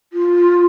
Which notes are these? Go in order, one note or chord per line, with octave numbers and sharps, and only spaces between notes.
F4